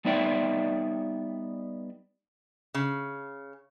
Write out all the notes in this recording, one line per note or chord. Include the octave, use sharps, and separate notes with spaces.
G3 B3 D#4 D5 E5 G5
C#3